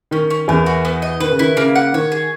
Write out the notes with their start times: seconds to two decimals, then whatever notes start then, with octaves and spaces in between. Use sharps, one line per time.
0.11 D#3 C#4
0.30 C#4
0.48 E2 E3 A#4
0.66 F#4
0.85 B3
1.02 D#5
1.20 D#3 B4
1.31 C#3
1.39 D#3 E4
1.57 C#3 A#3
1.75 F#5
1.94 D#3 C#5
2.12 G#4